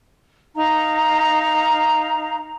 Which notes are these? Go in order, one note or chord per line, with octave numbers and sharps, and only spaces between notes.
D#4 F5 A#5